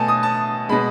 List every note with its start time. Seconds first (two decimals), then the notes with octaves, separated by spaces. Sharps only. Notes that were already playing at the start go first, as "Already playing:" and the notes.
Already playing: B2 A3 G#5 A5
0.08 D#6
0.23 A5
0.69 B2 G#3 B5